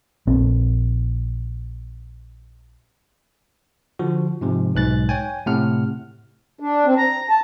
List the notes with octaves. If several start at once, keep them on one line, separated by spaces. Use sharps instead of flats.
A#1 C4
D3 F3 F#4
G#2 C3 F3
B1 G#2 F#6 A6
C#5 G5 G#5
A2 C3 F#5 F6
D4
C4
A#5
A5